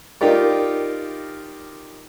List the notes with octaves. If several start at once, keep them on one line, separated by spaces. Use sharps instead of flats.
D#4 F4 G4 A#4 D5